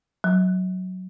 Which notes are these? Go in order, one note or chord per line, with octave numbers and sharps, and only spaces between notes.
F#3